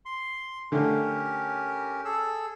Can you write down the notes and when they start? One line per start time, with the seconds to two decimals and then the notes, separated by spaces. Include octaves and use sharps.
0.06 C6
0.72 D3 A3 C#4 G4 A#4
2.05 G#4 A4 E6